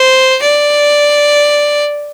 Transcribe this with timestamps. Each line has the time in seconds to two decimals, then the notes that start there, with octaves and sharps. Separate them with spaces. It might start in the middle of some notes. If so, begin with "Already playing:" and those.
Already playing: C5
0.42 D5